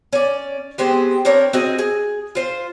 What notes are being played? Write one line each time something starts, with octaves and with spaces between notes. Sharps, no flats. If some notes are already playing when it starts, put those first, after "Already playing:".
C#4 D5
G#3 B3 C4 G4
C4 D4 A#4 C#5
C4 F#4 G#4 D#5
G#4
F4 C5